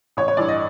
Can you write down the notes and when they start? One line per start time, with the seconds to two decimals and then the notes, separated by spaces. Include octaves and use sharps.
0.17 A1 C#5
0.28 C#5
0.37 G2 E3 D5
0.48 D#5